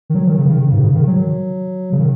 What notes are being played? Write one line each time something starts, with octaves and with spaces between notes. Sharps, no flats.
D#3
F#3
D#3
C#3
D#3
C#3
G#2
C#3
D#3
F#3
C#3
D#3